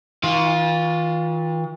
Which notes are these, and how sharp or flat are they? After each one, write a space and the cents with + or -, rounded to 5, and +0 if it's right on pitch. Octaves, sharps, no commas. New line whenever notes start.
E3 -45 F4 +10